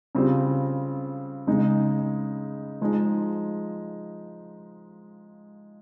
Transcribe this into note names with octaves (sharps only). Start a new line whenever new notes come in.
C#3 G3 C4 F4
C#3 G#3 D#4
F3 G#3 D#4